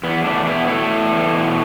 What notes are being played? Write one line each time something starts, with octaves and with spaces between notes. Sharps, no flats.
E2 B3
E2 A3 D4
B2 B3 E4
A3 E4 A4
E2
E2
B2